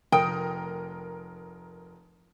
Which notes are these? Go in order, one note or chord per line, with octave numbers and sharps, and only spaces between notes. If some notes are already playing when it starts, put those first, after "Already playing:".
F1 A#4 G5 D#6